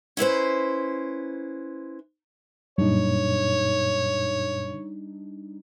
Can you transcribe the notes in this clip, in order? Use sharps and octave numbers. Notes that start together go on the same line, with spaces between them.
C#4 E4 B4 C5
F#2 A#2 G3 D4 D#4 C#5